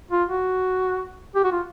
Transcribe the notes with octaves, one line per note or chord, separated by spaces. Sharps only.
F4
F#4
G4
F#4
F4